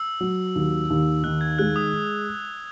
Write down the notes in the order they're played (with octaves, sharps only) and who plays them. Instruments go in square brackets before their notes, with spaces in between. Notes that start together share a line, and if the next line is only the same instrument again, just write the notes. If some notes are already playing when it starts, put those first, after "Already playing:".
Already playing: [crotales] E6
[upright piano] F#3
D#2
D#2
[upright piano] D#3 [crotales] F#6
[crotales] G#6
[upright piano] G#3 [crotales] F#6
[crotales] D#6